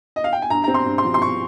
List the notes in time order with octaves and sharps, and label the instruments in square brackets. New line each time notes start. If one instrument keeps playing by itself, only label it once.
[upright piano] D#5
F5
G5
G#5
G2 A#5
C4 A#5
C6
G2
C6
F3
C6
C#6